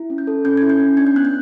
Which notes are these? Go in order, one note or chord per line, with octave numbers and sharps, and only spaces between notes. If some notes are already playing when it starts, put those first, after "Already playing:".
Already playing: E4
C#4
G6
A4
C#4 G6
E4 G#6
G6
C#4
D4 G#6
G6
B3 F#6
G6